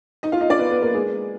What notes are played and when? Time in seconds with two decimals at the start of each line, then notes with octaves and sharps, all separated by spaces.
0.23 D#4 D#5
0.32 F4 F5
0.41 D#4 D#5
0.50 D4 D5
0.59 B3 B4
0.71 B3 B4
0.82 A#3 A#4
0.95 G#3 G#4